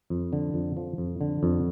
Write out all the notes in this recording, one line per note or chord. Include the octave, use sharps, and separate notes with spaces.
F2
D3
F2
F3
F2
D3
F2